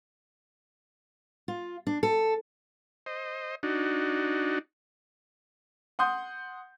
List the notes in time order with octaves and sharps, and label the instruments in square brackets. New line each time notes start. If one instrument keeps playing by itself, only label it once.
[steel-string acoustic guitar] F4
D4
A4
[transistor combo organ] C5 D#5
D4 D#4 F#4
[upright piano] F#5 C6 D#6 G6